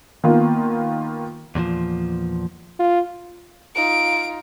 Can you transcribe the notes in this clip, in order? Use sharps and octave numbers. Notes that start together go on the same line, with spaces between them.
D#3 A#3 B3 F4
E2 A#2 D#3 F3
F4
D#4 F4 D7